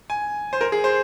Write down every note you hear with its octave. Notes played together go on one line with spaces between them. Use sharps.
G#5
C5
A#4
G#4
C5